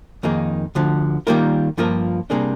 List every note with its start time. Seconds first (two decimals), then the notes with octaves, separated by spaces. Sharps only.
0.23 F2 D#3 A#3 D#4 G#4
0.75 D2 D3 F3
1.27 D#3 G3 A#3 F4 A#4
1.77 G2 F3 A#3 F4 A#4
2.30 C3 G3 A#3 D4 G#4